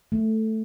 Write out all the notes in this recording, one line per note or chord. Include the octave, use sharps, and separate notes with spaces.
A3